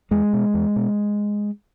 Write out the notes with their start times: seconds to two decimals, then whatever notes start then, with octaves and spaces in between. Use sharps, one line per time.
0.11 E2 G#3
0.33 B2
0.54 E2
0.76 B2